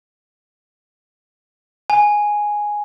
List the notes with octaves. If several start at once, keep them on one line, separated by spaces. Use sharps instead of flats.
G#5